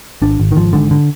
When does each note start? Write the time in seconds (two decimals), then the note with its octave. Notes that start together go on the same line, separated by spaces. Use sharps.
0.22 G#1 D4
0.40 G#1
0.51 D#3
0.56 G#1 F3
0.73 G#2 D3
0.91 D3